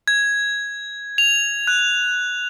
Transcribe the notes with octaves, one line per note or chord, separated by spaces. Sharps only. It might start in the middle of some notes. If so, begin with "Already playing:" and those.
G#6
F7
F#6